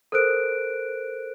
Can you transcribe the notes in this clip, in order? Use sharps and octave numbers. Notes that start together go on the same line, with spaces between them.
A4 A#4 C5 F#6 D7